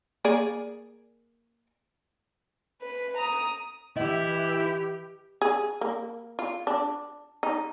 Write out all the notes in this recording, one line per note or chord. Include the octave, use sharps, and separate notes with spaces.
A#3 G#4 D5
B4
A#5 D#6
E3 E4 G4 D#5
G#4
A#3
F4
D4
D#4